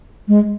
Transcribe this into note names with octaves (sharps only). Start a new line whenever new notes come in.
G#3